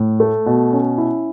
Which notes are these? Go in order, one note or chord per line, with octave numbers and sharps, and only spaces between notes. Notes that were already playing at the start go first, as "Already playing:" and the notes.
Already playing: A2
A3
B2
C#4
E4